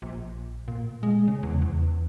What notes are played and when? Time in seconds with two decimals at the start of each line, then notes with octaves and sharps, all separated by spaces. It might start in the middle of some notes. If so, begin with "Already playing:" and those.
0.02 A#1
0.68 A#2
1.03 G#3
1.28 C#3
1.43 E2
1.62 E2